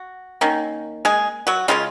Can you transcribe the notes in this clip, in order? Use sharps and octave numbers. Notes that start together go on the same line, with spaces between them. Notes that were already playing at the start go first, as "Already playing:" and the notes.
Already playing: F#4
D#3 A#3 C#4
G#3 G#4
F#3 F#4
C#3 G#3 C#4 F4